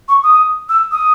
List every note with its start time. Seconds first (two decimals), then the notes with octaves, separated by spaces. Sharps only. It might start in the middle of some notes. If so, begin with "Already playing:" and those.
0.09 C#6
0.23 D#6
0.69 E6
0.92 D#6